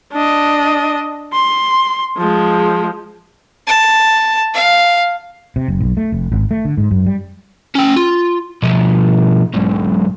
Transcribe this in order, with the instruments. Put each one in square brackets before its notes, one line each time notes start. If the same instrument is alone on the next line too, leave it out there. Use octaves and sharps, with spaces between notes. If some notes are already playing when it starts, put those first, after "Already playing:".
[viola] D4 D#5
C6
F3 G#3
[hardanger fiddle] A5
F5
[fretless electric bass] C3
F#1
B1
A3
F1
G#1
A3
D3
G#2
F#2
G3
[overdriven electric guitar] C#4 G5
F4
B2 F3
B1 G#2